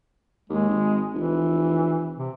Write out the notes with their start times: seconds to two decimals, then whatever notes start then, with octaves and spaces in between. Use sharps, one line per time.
0.50 D#2 G#3
0.69 G#1
1.14 F1 E3
2.18 C3